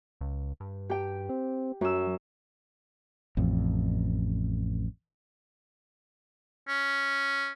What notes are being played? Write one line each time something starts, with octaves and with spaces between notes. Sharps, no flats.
C#2
G2
G4 G5
C4
F#2 F#3 E6
A1 F2
C#4